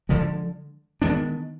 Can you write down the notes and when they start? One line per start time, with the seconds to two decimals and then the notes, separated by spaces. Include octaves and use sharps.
0.09 D3 F3 G#3
1.02 D#3 G#3 B3 D4